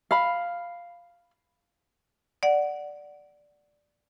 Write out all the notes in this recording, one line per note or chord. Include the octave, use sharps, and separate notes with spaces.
F5 B5
D5 F#5